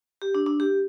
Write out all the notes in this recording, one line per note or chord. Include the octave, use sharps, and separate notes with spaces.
G4
D4
D4
G4